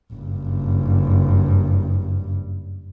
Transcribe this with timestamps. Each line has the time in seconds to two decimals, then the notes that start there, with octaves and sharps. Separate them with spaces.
0.13 F#1 G2